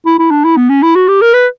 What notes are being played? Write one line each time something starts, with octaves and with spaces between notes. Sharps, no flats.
E4
E4
D4
E4
B3
C#4
E4
F#4
G4
A#4
B4